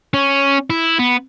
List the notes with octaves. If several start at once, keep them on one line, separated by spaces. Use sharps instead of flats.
C#4
E4
B3